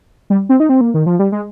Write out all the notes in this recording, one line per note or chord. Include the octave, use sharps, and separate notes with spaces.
G3
C4
D#4
C4
A#3
D#3
F3
G3
G#3